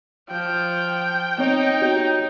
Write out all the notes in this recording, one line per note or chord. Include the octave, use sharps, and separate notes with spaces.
F3 G5
B3 C4 D#4 C#5
F#4 G4 C#5